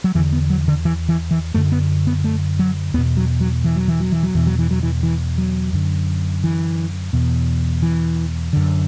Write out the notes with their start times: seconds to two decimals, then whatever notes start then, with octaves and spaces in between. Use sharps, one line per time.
0.04 F#3
0.14 E2 E3
0.18 D3
0.33 B3
0.50 F#3
0.68 D3
0.85 E3
1.09 E3
1.31 E3
1.54 F#2 D3 A3
1.72 B3
2.07 B3
2.24 A3
2.59 F#3
2.94 E2 B3
2.98 B2
3.17 F#3
3.40 F#3
3.64 E3
3.76 F#3
3.88 E3
4.00 F#3
4.12 E3
4.23 F#3
4.34 E2 B2 E3
4.47 F#3
4.59 E3
4.71 F#3
4.83 E3
5.03 E3
5.38 F#3
5.73 F#2 D3
6.44 E3
7.13 E2 B2
7.82 E3
8.53 F#2 D3